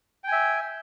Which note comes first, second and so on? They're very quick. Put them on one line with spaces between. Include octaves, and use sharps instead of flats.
G5 G#5 E5